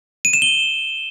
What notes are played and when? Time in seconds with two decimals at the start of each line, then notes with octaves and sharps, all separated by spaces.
0.25 D#7
0.33 E7
0.42 G7